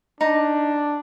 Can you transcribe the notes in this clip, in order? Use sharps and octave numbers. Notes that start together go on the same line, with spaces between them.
D4 D#4